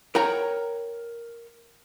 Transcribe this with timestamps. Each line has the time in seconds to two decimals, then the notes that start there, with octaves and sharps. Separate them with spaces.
0.15 A#4 C#5 F#5 G5 A#5